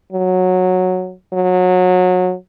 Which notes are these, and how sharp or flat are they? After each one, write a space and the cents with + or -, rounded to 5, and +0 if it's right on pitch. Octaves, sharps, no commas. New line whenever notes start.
F#3 -10
F#3 -25